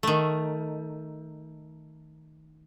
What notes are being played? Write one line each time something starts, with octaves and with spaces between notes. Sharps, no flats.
D#3 A3